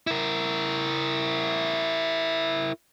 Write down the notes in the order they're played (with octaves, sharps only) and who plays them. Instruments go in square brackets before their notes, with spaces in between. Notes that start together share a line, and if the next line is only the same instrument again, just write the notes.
[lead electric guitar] E4 A#4